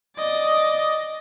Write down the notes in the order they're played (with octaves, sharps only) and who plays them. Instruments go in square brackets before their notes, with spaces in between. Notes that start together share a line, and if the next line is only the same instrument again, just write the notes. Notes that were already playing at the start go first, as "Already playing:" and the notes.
[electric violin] D5 D#5